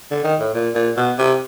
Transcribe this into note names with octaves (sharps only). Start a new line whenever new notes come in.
D3
D#3
A2
A#2
A#2
B2
C3